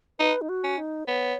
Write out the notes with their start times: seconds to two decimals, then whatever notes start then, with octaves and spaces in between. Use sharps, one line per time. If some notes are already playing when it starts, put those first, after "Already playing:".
0.19 D#4 B4
0.41 D#4
0.49 F#4
0.64 C#4
0.78 D#4
1.07 B3 C#5